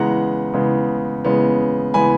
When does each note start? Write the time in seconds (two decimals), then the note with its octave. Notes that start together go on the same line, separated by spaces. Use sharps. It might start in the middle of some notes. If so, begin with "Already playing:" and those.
Already playing: C#3 E3 G#3 B3 F#5 A#5
0.54 C#3 E3 G#3 B3
1.25 C#3 E3 G#3 B3
1.94 C#3 E3 G#3 B3 G#5 B5